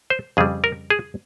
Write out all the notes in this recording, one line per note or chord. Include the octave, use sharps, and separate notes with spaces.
C5
F2 C#3 G3 G#4
A#4
G#4